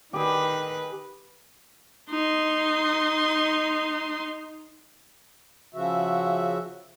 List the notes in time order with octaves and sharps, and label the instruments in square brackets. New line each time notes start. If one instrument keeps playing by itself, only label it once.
[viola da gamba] D#3 B4 [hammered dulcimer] G4 G#4
[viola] D#4 C6
[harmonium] C#3 F3 F#4 E5